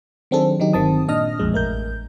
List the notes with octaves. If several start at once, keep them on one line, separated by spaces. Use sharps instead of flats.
D#3 F#3 C4 D4 G#4 A4
D#3 F#3 D#4 G4
G1 D#3 C4 A5 D#6
A#2 D4 D#5 D#6 F6 A#6
B1 F2 A#2 G#3
A1 A3 A#4 G6